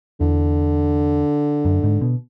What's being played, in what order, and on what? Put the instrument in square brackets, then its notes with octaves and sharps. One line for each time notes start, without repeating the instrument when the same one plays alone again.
[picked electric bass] E2 [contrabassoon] D3
[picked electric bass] F#2
G#2
B2